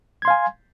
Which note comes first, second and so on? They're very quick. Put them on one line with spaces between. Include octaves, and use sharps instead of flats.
G#6 C6 F5 G#5